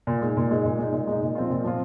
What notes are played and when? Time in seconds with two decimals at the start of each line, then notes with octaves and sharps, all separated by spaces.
0.07 A#2
0.22 G#3 D#4
0.37 A#2
0.51 G#3 D#4
0.65 A#2
0.79 G#3 D#4
0.93 A#2
1.07 G#3 D#4
1.22 A#2
1.35 F3 C4 F4
1.50 A#2
1.64 F3 C4 F4